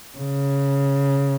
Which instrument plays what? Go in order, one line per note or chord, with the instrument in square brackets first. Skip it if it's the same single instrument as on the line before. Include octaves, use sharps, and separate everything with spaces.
[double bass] C#3